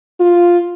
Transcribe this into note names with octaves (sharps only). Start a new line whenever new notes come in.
F4